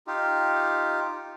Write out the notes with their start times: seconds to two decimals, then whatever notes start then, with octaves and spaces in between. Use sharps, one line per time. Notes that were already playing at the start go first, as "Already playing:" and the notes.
0.07 D#4 F4 G4